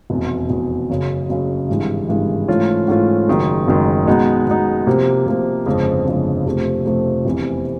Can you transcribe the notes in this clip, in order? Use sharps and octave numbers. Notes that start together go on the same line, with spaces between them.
F1 E2 B2
F1 E2 B2
F#1 F#2 C#3 F#3
F#1 F#2 C#3 F#3
G#1 G2 E3 G#3
G#1 G2 E3 G#3
G#2 E3 A3 C#4 F4
G#2 E3 A3 C#4 F4
F#1 F#2 D#3 G#3
F#1 F#2 D#3 G#3
B2 G#3 B3 D#4
B2 G#3 B3 D#4
C3 F3 A#3
C3 F3 A#3
G1 F2 C#3 F3 G#3
G1 F2 C#3 F3 G#3
F2 C3 F3 A3
F2 C3 F3 A3
F1 E2 C3 E3